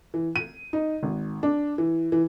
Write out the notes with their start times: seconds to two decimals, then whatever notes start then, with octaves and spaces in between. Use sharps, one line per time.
0.14 E3
0.36 D#7
0.73 D#4
1.03 G#1
1.43 D4
1.78 E3
2.12 E3